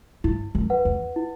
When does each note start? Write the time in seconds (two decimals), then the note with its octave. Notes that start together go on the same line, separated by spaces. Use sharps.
0.24 G2 E4
0.55 F#2
0.70 B4 F#5
0.85 E2
1.16 E4